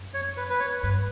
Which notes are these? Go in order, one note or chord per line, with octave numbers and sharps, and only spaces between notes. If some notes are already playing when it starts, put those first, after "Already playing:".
Already playing: F#2
C#5
B4
B4
C#5
G2 B4